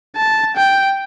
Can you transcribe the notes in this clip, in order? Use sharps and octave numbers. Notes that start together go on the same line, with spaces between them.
A5
G5